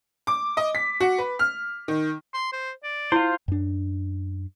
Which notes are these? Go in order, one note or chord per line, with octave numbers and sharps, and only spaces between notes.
D6
D#5
B6
F#4
B4
F6
D#3
C6
C5
D5
E4 F4 C5
F#2 D4